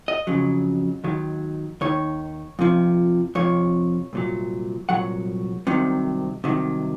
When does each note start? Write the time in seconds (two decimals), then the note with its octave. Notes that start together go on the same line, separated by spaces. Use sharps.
0.08 D#5
0.27 F2 C#3 F#3
1.04 D#2 D#3 F#3
1.81 D#2 D#3 C#5
2.59 F2 C3 F3
3.35 F2 C3 F3 C#5
4.13 C2 A#2 F#3
4.89 C2 A#2 F#3 F#5
5.67 C2 C3 D#3 F#3
6.44 C2 C3 D#3 F#3